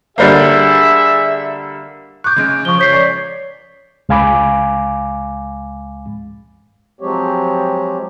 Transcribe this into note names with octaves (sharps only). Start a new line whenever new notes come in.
D3 G3 A#3 G#4 E5
C#6 D6 F#6 G6
C#3 G#3 D7
F3 C#6 G7
C#5 G6 B6 C7
D5
C#2 G#3 F5 G#5 B5 D6
F3 F#3 G#3 C4 G4 C#5